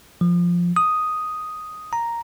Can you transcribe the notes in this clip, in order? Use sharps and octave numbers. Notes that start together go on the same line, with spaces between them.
F3
D#6
A#5